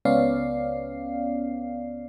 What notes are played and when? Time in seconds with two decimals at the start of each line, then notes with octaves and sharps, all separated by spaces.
0.05 C#2 B3 C#4 D5 F5 C7